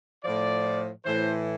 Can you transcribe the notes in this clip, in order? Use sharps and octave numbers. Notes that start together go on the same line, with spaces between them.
A2 F3 D5
A2 E3 C5